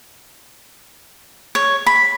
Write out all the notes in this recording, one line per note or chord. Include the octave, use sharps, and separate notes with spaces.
C#5
B5